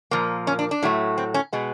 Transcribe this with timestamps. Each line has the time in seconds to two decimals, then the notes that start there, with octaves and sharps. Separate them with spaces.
0.11 A#2 F3 A#3
0.47 C#4
0.59 D4
0.71 D4
0.83 A2 F#3 A3
1.18 C4
1.34 C#4
1.53 B2 G#3 B3